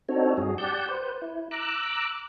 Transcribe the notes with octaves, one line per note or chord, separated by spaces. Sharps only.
C4 D4 D#4 F#4 A4 C#5
G2 F#4 G#4
G4 D5 F#5 A5 G6
B4 C5
E4
A#5 D6 E6 F#6